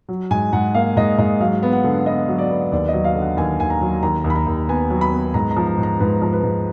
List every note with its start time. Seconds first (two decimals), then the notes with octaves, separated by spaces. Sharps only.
0.09 F#3
0.31 G#2 G#5
0.53 G#2 F#5
0.75 A#3 F5
0.96 G#2 D#5
1.18 G#2 D#5
1.40 F#3 F5
1.63 B3
1.72 F#5
1.84 D3
2.06 B3 D#5
2.28 F#3
2.38 D5
2.50 B3
2.72 D#2 D5
2.88 F#3 D#5
3.04 F5
3.15 D3
3.21 F#5
3.37 D#2 G#5
3.59 D#2 G#5
3.70 A#5
3.81 F#3
4.02 D#2 A#5
4.24 D#2
4.30 B5
4.35 A#5
4.47 D#2
4.68 B3 G#5
4.90 F#3
5.01 B5
5.12 B3
5.34 G#2 A#5
5.51 A#5
5.57 F3
5.67 A#5
5.78 G#2
5.83 A#5
6.00 G#2 B4
6.22 F3
6.33 B4
6.43 G#2